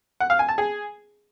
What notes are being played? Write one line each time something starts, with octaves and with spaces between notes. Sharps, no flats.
F#5
F5
G#5
A5
G#4